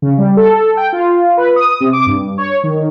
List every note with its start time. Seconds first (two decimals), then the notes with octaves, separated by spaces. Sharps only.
0.02 C#3
0.18 G3
0.37 A4
0.77 G5
0.93 F4
1.37 B4
1.56 D#6
1.80 C3
1.93 D6
2.06 G2
2.38 C#5
2.63 D#3